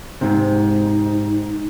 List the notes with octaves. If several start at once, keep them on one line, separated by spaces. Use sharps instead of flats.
G#2 C3 D#4